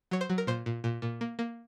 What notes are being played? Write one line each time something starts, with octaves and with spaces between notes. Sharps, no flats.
F#3 C#5
C5
F#3
A#4
A#2 C5
A#2
A#2
A#2
A#3
A#3